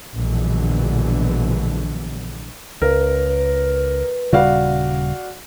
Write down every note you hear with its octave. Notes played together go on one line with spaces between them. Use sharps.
A#1 B2 D3 E3 F#3 G#3
C#2 A#4 B4
D#1 C#3 G3 F#4 D5 F5